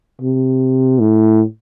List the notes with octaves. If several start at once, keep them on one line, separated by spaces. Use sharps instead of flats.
C3
A2